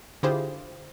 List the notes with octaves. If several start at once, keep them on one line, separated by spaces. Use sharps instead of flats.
D3 E4 F4 G4 G#4 C5